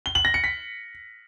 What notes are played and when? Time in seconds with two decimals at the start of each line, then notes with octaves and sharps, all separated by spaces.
0.06 G7
0.15 F#7
0.25 A#6
0.34 C#7
0.44 B6